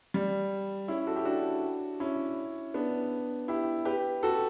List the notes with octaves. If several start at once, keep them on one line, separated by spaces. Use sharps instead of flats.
G3
C#4 E4
F#4 A4
E4 G4
D4 F#4
C#4 E4
B3 D4
E4 G4
G4 B4
F#4 A4